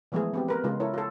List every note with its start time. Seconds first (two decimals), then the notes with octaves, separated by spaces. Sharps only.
0.12 E3 F3 G#3 A3 B3 G#4
0.34 B3 C4 G4
0.48 B3 A#4 B4
0.64 C#3 G#3 F4
0.80 E4 A4 A#4 C#5
0.94 F4 A4